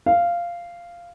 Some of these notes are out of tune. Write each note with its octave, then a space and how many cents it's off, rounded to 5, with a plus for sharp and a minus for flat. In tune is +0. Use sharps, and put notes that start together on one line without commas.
F5 -10